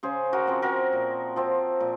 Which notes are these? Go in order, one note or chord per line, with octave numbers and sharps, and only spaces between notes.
C#3 G#4 C5
F#4 A#4
F3 C4
F#4 A#4
A#2
F3 C4
A#2